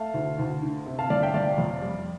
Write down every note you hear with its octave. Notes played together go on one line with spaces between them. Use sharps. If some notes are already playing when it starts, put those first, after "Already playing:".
Already playing: A3 F5 A5
D2
D2
D3
C3
F5 A5
G1 D5 F5
E5 G5
G1 D5 F5
F2
G3